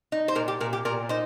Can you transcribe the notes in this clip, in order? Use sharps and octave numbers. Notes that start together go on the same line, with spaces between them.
D#4
C5
A#2 A#4
G4
A#2 A#4
G4
A#2 A#4
D#4 C5